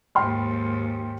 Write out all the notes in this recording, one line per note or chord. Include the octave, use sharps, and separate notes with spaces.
D#2 G#2 G5 C6 F6